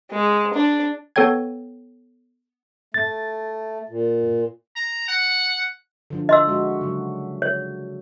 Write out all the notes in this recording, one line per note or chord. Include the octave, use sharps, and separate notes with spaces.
G#3
D4
B3 A4 C#5 G5 G#6
A3 A6
A#2
A#5
F#5
D3 F3 D4
D#5 C6 E6
G#3 F#4 E5
C#3 F#3
C#5